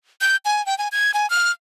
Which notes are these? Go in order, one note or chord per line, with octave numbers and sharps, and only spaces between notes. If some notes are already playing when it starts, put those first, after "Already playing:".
G6
G#5
G5
G#5
G#6
G#5
F6